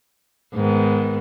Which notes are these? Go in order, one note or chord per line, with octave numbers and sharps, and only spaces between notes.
G#2 D#3 B3